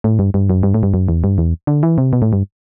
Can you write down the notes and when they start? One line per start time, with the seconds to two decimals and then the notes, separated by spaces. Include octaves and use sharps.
0.04 A2
0.19 G2
0.34 G2
0.50 F#2
0.63 G2
0.74 A2
0.83 G2
0.94 F#2
1.08 E2
1.24 G2
1.38 E2
1.67 D3
1.83 E3
1.98 C3
2.13 B2
2.22 A2
2.33 G2